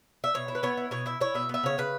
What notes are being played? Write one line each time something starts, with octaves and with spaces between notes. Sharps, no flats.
E5
B2 C#5
E4
B4
B3 C#5
E4
B2 C#5
E4 E5
E4 C#5
B2 E5
B3 E5
C#3 C#5
C#3 B4